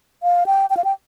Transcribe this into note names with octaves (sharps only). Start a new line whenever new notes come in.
F5
G5
G5
F5
G5